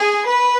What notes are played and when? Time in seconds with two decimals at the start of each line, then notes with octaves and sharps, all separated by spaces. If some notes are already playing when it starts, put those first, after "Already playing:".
Already playing: G#4
0.26 B4